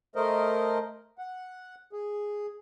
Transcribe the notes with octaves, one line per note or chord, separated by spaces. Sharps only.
A3 A#4 C5 D#5
F#5
G#4